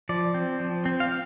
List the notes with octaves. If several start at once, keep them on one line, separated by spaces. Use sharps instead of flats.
F3 D5
C4
F3
C4
F5